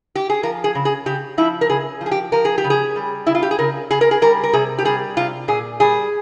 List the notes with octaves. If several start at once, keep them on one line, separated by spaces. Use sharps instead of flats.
G4
G#4
F3 A#4
G#4
C#3
G#4
C#3 G4
F3 E4
A#4
C#3 G#4
F3
G#4
G4
F3 A#4
G#4
G4
C#3
G#4
G3
C#3 E4
F4
G4
G#4
C#3 A#4
C#3 G#4
A#4
G#4
G3 A#4
A#4
C3 G#4
G4
G3 G#4
C3 F4
A#2 G#4
G3 G#4